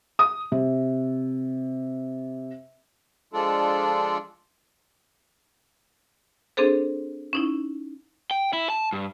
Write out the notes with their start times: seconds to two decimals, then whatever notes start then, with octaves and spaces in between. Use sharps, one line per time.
0.19 D#6
0.52 C3
3.33 F3 G#3 D4 F4 A4 D5
6.57 C4 D4 G#4 A4 C5
7.33 C#4 D#4 E4
8.31 G5
8.53 E4
8.70 A5
8.93 G2